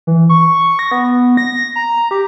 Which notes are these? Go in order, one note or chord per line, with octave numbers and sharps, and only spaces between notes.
E3
C#6
A#6
B3
A#6
A#5
G4